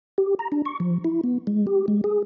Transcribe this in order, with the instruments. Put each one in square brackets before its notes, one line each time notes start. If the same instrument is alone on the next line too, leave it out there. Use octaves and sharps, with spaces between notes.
[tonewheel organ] G4
A#5
D4
C#6
F3
E4
B3
G#3
G4
G#3
G#4